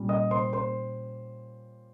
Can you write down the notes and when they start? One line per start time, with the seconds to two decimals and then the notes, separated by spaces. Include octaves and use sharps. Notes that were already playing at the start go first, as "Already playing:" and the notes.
Already playing: A#2 G3 C#4
0.09 D#5 D#6
0.31 C5 C6
0.53 C5 C6